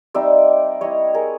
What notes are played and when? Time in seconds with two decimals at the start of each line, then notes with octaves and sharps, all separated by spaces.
0.14 G3 C4 D#4 D5 E5
0.81 G3 C4 E4 C#5 D#5
1.14 G#4 A#4